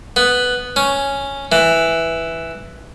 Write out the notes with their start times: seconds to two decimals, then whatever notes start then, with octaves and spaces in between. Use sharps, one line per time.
0.16 B3
0.76 C#4
1.52 E3